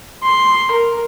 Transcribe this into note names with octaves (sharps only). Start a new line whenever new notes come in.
C6
A#4